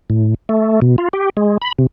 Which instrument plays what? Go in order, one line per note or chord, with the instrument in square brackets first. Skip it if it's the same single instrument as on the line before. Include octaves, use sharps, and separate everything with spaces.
[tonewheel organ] A2
A3
B2
F4
G4
G#3
B5
C3